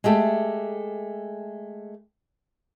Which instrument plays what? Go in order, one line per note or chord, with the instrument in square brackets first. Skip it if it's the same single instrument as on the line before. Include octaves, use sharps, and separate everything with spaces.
[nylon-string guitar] G#3 A3 G4 A4